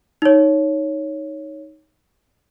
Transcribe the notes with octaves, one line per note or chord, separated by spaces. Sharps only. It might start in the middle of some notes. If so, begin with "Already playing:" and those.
D#4 C#5